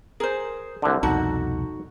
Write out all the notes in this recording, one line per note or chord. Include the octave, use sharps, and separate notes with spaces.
G#4 A#4 C5
C2 D3
C2 F2 B2 D#4 F#4 A4 F#5